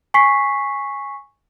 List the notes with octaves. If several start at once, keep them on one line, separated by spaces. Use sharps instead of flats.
G#5 C#6 B6 C7